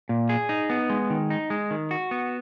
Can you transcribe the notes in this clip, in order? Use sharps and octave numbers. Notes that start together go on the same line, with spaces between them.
A#2
G#4
D#4
B3
G#3
D#3
D#4
G#3
D#3
F#4
B3